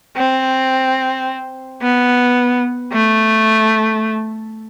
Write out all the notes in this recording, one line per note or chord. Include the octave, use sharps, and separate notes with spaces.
C4
B3
A3